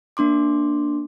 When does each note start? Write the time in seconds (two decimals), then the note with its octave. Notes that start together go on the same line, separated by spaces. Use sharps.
0.17 A#3 D4 C6 D6